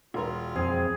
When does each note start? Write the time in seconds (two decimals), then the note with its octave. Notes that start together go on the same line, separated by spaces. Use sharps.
0.14 E1 F4 A#4
0.56 F2 C4 G#4